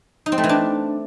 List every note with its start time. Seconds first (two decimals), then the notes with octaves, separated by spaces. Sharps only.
0.26 D#4
0.32 C4
0.38 A3
0.44 E3
0.49 D4